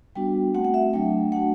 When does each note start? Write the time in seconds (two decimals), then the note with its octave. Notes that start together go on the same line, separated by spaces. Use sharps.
0.15 G3 B3 D4 F#4 G5
0.54 A3 C4 F#4 F#5
0.65 F#5
0.74 E5
0.93 F#3 A3 D4 G5
1.32 A3 D4 F#4 F#5